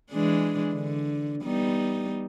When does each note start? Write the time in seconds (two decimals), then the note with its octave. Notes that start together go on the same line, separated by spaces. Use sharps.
0.11 E3 G#3 D4
0.73 D3
1.44 G3 B3 D#4